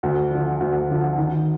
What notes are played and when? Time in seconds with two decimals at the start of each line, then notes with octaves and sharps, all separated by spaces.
0.03 D2
0.31 D3 F3
0.60 D2
0.90 D3 F3
1.18 D#3